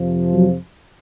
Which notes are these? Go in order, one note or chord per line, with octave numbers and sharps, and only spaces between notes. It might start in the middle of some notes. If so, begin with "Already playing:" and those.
Already playing: F2 C3 F3
F#3